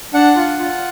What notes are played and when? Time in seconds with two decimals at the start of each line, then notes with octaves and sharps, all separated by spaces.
0.14 D4 F#5
0.36 F4
0.59 F4